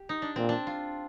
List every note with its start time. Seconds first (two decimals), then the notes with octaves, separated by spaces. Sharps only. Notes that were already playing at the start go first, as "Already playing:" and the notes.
Already playing: G4
0.09 D#4
0.22 D4
0.36 A#2 C4
0.49 D4
0.67 F4